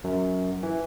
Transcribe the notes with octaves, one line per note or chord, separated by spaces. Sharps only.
F#2
E3